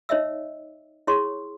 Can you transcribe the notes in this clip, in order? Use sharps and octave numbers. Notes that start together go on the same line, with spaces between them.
D#4 C#5 D#5 E5 E6
E4 G#4 C#5 C6 C#6